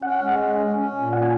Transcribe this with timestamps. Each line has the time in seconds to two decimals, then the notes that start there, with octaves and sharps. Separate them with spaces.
0.02 C#4 F#5
0.21 G#3
0.39 C#4
0.58 C#4
0.76 C#4
0.94 A#2
1.13 C#4 F#5
1.23 G#5